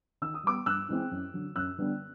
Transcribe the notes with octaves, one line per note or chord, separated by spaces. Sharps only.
D#3 E6
D#6
G3 B3 D6 E6
G2 E6 F#6
E3 G#3 C4
F#2
D3 F#3
F#2 E6 F#6
D3 G3 B3 D4